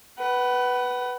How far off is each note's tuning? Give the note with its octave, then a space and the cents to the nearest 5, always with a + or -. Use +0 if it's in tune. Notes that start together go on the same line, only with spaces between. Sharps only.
B4 +0 F#5 +30